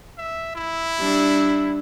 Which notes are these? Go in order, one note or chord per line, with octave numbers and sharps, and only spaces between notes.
E5
E4
G3 D4